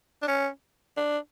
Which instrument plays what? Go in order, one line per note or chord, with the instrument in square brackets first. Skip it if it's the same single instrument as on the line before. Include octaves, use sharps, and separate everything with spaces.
[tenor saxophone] D4
C#4
D4